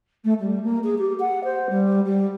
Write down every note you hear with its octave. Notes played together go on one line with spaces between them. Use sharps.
A3
G3
A#3
G#4
G4
F#5
C5
G3
G3